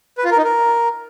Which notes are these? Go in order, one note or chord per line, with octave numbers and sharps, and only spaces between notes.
B4
F4
A#4
D#4
A#4